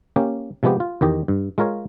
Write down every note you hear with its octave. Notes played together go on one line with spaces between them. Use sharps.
A#3 C#4 G4
C3 F3 G#3 B3 G4
F4
E2 D#3 G4 D#5
G2
G#3 F4 A#4 C#5 F5